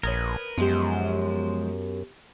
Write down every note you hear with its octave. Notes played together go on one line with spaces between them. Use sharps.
A#1 A#4 B4 C#5 D#6 G#6
F#2 F3 G#3 B3 G4 C5